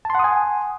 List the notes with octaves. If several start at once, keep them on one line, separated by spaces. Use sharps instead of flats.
F#5 G#5 A5 C6 D#6